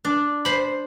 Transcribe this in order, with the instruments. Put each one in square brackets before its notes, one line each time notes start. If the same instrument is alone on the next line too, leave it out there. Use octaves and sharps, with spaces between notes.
[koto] D4
[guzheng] C5 B5